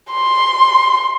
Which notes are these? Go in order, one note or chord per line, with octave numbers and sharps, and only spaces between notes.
C6